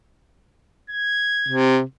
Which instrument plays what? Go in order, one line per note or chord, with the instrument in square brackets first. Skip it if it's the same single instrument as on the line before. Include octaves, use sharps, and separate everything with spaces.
[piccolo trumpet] G#6
[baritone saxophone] C3